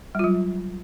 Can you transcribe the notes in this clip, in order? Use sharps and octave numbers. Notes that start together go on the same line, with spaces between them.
F#3 G3 F4